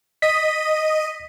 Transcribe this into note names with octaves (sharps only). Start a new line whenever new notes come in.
D#5 B6 D#7